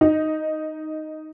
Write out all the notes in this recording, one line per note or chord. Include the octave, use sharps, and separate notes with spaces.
D#4